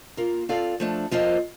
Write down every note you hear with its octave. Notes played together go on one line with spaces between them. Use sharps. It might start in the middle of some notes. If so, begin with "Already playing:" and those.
A#3 F4 A#4
C4 F4 A4 D5 F5
F3 A3 D4
F3 A#3 F4 C5 D#5